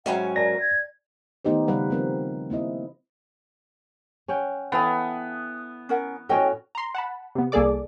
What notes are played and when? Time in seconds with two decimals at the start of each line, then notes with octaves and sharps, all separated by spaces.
0.06 G#2 F#3 C#4 E5 F#5 G5 B5
0.36 A#4 D5 A5 A#6
0.60 G#6
1.45 D#3 A3 B3 D#4 G4 C5
1.67 C#3 G3 B4 F5 F#5
1.90 F3 G3 C4 A#4
2.50 A#3 C4 E4 D#5
4.28 C#4 F#5 G5
4.72 E3 B3 A4 F5 G5 A5
5.89 C#4 A#4 F#5
6.29 A2 C#4 F#4 A4 D#5 G5
6.75 A#5 C6
6.95 F#5 A5 B5
7.35 C3 B3
7.52 C2 A#3 G#4 A4 D5 D6